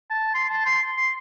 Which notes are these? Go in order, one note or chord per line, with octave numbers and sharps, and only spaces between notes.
A5
C6
A5
C6
C6